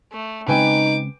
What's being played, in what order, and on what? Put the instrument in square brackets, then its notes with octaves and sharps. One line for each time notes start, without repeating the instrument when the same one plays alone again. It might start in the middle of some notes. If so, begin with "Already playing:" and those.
[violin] A3
[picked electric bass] C#3 G#3 C4 [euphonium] D#4 [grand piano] B4 G5 G#5 [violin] D6